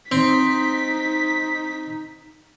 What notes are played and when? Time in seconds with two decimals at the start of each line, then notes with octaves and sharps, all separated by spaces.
0.12 C4 D#4 B6